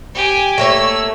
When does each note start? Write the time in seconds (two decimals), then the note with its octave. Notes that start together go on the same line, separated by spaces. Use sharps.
0.15 G4 G#5
0.58 A3 A#3 C#5 E6